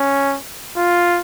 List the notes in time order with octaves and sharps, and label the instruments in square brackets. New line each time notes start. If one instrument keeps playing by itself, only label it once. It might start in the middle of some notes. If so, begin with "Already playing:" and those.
Already playing: [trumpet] C#4
F4